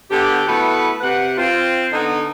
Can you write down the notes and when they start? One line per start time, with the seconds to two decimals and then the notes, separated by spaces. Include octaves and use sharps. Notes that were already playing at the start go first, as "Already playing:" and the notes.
0.11 D3 B3 G4
0.47 A3 B3 E4 F#4 B4
1.01 C3 B4 F#5
1.37 C4 F4
1.93 D3 B3 D#4